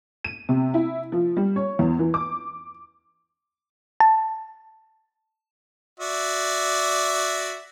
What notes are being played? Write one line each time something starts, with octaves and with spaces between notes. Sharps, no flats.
D#7
C3
E4
F3
G3
C#5
E2
E3
D6
A5
F#4 D5 E5